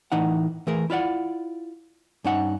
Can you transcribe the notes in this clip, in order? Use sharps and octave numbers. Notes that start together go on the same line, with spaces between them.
A2 E3 D#4 F#5
E3 A3 G#4 A#4
E4 F4 D5 F#5
G2 C#4 D#4 F#5